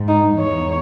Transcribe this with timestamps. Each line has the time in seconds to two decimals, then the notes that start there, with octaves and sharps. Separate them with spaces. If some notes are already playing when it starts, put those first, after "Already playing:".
Already playing: G#2
0.08 D#4
0.39 E2 C#5